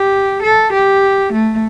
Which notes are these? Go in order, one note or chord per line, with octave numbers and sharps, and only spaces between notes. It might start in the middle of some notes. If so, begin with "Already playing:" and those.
Already playing: G4
A4
G4
A3